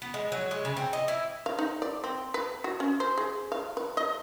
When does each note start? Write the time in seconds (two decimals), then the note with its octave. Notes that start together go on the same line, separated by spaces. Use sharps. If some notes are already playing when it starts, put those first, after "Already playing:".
0.02 B3
0.14 G#3
0.32 F#3
0.51 G#3
0.65 C#3
0.77 C4
0.93 D#5
1.08 E4
1.46 F5
1.59 D#4
1.82 D5
2.04 C4
2.34 B4
2.64 F#4
2.80 C#4
3.00 C5
3.18 G#4
3.52 F5
3.77 B4
3.97 D#5